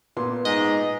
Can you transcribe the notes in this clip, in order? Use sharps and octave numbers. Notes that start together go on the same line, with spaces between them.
A#2 B3 C6
G#2 D#5